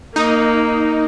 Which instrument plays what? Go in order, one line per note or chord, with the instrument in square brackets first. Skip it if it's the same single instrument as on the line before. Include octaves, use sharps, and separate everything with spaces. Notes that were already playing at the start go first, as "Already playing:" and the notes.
[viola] A#3 [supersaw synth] D#4